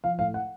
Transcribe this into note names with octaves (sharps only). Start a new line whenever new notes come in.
F3 F5
A2 F5
F#5